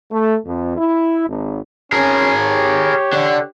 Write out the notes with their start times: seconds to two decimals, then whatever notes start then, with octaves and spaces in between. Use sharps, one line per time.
0.11 A3
0.46 F2
0.77 E4
1.28 G#1
1.92 C#4 G#4 A#4
2.42 G4 C#5
3.13 D3